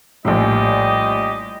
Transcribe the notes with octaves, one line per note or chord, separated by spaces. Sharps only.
A#1 A2 G3 G4 D#5